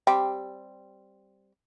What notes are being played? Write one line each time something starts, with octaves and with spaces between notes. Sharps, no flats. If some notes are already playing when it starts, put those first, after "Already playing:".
G3 C4